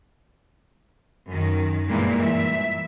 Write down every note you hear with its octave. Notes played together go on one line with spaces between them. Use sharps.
F#2 D#3
G2 A#2 E3 G3 G#3 A#3
E5